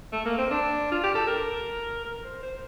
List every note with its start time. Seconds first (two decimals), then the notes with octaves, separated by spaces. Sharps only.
0.12 A3
0.25 A#3
0.38 C4
0.51 D4
0.92 F4
1.04 G4
1.15 A4
1.27 A#4
2.05 A#4
2.24 C5
2.43 C5